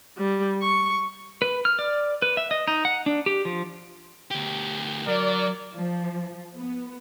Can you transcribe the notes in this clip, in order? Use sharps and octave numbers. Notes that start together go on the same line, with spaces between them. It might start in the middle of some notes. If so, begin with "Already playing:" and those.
G3
C#6
B4
F6
D5
B4
E5
D#5
D#4
F#5
D4
G4
F3
D2 G4
F#3 A#4 D5
F3
B3